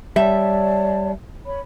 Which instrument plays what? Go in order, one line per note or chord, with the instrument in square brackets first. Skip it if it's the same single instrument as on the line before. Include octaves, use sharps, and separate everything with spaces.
[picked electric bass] G3 [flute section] C#5 D5 A5 [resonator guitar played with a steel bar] E5
[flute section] C#5 B5